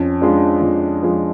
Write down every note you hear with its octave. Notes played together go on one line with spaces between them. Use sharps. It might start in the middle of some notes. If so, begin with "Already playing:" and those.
Already playing: F2 C#4
F3 G#3 D4
F2
F3 G#3